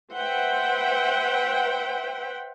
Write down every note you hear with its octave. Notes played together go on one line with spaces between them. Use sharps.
B4 C5 E5 F#5 G5